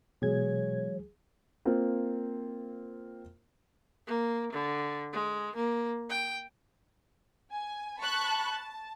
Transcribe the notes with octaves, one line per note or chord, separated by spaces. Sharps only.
B2 E3 F#3 G#3 G#4 C#5 G#6
A#3 C4 F4
A#3
D3
G#3
A#3
G5
G#5
A5 B5 C#6 F#6
A5